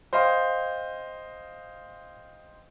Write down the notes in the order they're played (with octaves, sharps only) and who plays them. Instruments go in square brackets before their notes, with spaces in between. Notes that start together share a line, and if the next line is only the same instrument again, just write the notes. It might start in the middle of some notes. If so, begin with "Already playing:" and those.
[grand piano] C5 D#5 F5 G5 C6